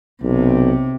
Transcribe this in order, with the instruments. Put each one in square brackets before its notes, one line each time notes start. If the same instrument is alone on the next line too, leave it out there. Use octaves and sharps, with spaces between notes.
[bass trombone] B1 [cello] C3